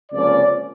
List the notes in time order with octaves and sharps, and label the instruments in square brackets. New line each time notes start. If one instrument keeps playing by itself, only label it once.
[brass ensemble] C#2 C3 F3 A#3 C#4 D5